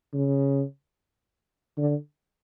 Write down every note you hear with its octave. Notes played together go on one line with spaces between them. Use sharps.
C#3
D3